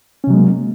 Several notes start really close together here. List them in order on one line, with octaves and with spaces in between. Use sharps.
C#4 C3 F#3 G#3 A#3